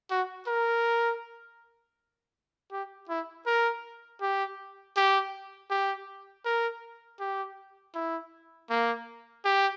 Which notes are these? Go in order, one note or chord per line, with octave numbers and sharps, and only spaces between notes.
F#4
A#4
G4
E4
A#4
G4
G4
G4
A#4
G4
E4
A#3
G4